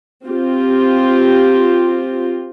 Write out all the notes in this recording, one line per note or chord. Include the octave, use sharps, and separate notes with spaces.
C4 F4 G4